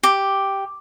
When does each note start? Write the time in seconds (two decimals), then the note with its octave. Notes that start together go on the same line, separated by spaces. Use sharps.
0.03 G4